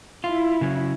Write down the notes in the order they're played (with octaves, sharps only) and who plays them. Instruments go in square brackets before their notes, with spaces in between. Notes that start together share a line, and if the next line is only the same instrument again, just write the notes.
[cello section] E4 [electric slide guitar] F4
[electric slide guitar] C#3 F#3